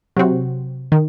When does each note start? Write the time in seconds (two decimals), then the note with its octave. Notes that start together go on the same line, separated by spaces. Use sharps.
0.17 C3 F#3 C4 F#4
0.92 D#3